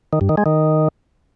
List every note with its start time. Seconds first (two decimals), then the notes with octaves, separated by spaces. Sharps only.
0.13 D#3
0.21 G2
0.29 D#3
0.37 G#3
0.46 D#3